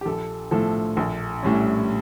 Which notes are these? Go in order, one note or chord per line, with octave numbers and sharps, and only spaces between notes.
G4
A#1 A4
A2 F3 A4
A#1
A2 G3 C#4